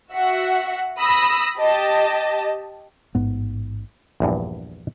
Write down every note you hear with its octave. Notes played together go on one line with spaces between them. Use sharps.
F#4 E5 F#5
B5 D#6 E6 A#6
G4 D#5 A5
A1 G#2 B3
A#1 E2 G2